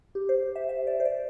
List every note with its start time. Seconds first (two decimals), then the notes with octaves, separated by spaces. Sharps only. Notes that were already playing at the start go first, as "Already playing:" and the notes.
0.15 G4
0.29 C5
0.56 E5
0.69 E5
0.87 D5
1.00 C5
1.05 D5